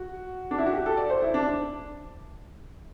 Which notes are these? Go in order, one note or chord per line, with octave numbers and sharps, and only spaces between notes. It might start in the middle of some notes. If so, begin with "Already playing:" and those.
Already playing: F#4
D4
E4
F#4
G4
A4
D5
C5
E4
D4